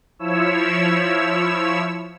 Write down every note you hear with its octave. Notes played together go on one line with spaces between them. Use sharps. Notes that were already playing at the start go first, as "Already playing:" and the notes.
F3 E4 C#5 E6